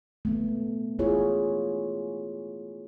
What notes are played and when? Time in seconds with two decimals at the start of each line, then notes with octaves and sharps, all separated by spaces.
0.25 A3 B3
0.99 E4 F4 G#4 C#5